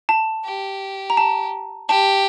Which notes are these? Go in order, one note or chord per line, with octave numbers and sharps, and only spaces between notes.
A5
G4
A#5
A5
G4 A5